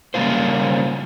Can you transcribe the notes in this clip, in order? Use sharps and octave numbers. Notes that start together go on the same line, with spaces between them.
C#3 G3 A#3 C#4 F4 C5